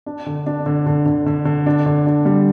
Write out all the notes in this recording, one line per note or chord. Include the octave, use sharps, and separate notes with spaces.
D4
D3
D4
D3
D3
D3
D3
D3
D4
D3
D4
G3